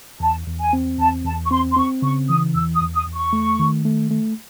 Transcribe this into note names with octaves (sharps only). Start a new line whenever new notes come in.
E2 A5
E2
G#5
C4
E2 A5
E2 A5
C#6
C4 C6
C6
C4 C#6
C#3 C#6
E3 D#6
E2 E6
D#6
E2
D#6
E2
C#6
A3
D#3
A3
A3